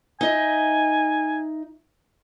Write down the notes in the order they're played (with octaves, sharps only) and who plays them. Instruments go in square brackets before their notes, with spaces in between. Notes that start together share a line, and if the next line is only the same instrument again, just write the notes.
[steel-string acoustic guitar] D#4 D#5 E5 [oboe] G#5